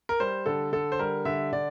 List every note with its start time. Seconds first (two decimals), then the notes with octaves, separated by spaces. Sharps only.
0.09 A#4
0.20 G3 C5
0.46 D3 A4
0.72 D3 A4
0.92 C5
0.99 G3 A#4
1.25 D3 E5
1.52 D3 D5